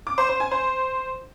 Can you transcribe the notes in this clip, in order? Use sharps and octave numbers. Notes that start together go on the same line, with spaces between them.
D6
C5
C5
G#5
C5